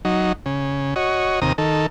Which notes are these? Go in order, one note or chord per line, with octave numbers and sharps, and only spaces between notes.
F#3 D#4
C#3
F#4 C#5 D#5
D#2 C3 A#5 D#6
D#3 A4